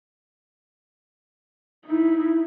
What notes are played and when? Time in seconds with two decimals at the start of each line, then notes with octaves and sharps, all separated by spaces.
1.86 D#4 E4